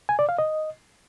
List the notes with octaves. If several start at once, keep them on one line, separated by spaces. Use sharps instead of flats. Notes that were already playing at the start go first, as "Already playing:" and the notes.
G#5
D5
F5
D#5